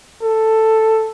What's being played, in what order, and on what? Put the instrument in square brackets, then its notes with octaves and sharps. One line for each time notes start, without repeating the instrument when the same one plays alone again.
[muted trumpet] A4